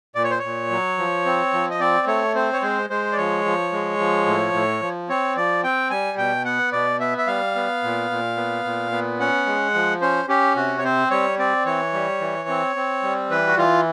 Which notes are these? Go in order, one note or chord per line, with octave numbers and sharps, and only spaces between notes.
A#2 D5
C#5
C5
A#2 C#5
F#3
F3
C4
F3
D#5
C4 D5
A3 C#5
C4 C5
C#5
G#3 C5
G#3 C5
D5
F3 C#5
F3
G#3
F3
A2
A2
F3
C4 C#5
F3 D5
C4 G5
G3 G#5
B2 G5
B3 F#5
B2 D5
B3 E5
E5
G3 F5
B3
A#2
A#2
B3
A#2
B3
C#4 F#5
G#3
F3
C#4 C5
C#4 G4
C3 F#4
C#5
C4 C5
G3 C#5
C4 D5
E3 C#5
G3
E3
C4
C4
G3
E3 B4
F#4
E3 F4